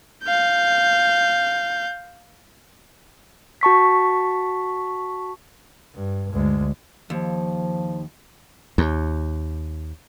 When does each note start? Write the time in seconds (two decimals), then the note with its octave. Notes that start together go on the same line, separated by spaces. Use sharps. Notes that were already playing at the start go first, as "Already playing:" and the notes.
0.24 F5 G6
3.61 F#4 A5 C#6 B6
5.95 G2
6.33 D2 G#3
7.10 D#2 F3
8.78 D#2